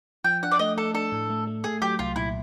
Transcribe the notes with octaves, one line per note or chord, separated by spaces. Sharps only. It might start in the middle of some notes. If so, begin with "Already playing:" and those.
F3 G5
D4 F#5
D5
A3 D#5
A3 A4
D4 A4
A2
A3
A3
A3 G#4
F#3 G4
C2 F4
A#2 E4